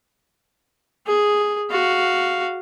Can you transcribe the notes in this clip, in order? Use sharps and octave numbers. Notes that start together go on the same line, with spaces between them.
G#4
F#4 F5